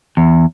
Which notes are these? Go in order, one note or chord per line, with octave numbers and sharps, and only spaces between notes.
E2